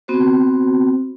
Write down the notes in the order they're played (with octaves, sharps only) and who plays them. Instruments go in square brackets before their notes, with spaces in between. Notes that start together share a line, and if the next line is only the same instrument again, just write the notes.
[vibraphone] B3 C4 F#4 C5